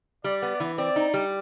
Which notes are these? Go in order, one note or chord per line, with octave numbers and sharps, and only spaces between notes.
G3 D5
B3
E3
C4 D5
D#4
G3